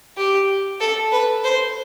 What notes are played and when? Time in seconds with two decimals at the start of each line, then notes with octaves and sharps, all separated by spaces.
0.17 G4
0.80 A4
1.12 B4
1.44 C5